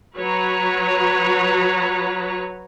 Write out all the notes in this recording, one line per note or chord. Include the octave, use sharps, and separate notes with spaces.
F#3 F#4 B4 C#5 A#5